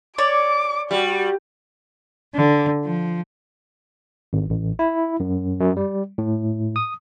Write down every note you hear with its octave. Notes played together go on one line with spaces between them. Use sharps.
C#5 D5 D6
G3 F#4
D3
F3
G#1
A1
E4
F#2
F#2
G3
A2
D#6